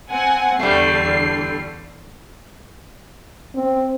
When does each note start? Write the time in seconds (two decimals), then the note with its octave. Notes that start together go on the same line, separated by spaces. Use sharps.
0.10 C4 F#5 G#5
0.60 E2 D3 G3 A3 C7
3.55 C4